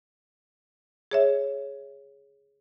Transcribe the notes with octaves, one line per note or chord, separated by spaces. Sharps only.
G#4 C#5 E5